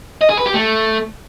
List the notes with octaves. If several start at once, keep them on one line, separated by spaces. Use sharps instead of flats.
D#5
G#4
B4
G4
A3